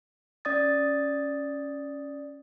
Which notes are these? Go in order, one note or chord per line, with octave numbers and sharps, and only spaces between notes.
C#4 D5 D#6 A6